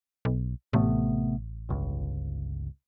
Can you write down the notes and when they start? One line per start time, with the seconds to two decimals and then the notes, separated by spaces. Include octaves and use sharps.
0.25 B1
0.73 A1 C3 A3 B3
1.69 G1 C#2